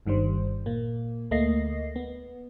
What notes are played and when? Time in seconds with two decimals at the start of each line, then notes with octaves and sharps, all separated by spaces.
0.06 G1 G2 D#3 G3 C5
0.66 A#2 A#3
1.31 D2 A3 A#3 D#5 A#6 C7
1.96 B3